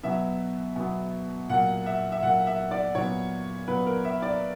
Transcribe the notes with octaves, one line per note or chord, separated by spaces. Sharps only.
B2 F#3 B3 E5
B2 F#3 B3
A#2 F#3 A#3 F#5
E5
E5
A#2 F#3 A#3 F#5
E5
D5
A#2 F#3 B3 C#5
A#2 F#3 B3 B4
A#4
E5
D5